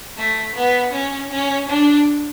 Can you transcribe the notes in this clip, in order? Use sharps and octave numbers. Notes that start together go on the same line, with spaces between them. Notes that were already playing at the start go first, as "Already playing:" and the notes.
A3
B3
C#4
C#4
D4